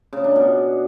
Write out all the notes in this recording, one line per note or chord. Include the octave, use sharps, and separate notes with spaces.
C#3
D4
B2